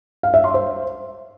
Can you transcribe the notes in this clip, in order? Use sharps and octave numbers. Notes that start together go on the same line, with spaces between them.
F5
E5
C6
C5